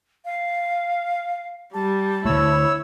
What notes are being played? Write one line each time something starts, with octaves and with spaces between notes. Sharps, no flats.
F5
G3 A5
D3 A3 E4 C#5 E6